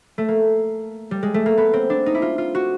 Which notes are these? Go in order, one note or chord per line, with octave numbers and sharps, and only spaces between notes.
A3
A#3
G3
G#3
A3
A#3
B3
C4
D4
D#4
E4
F4
F4
F#4